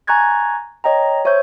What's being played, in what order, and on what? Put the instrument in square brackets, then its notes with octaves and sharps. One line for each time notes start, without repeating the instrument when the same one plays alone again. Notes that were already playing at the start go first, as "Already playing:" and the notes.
[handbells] G#5 A#5 C#6 F#6 G#6 A6
C#5 D#5 G5 A#5
C5 C#5 E5 C#6 G6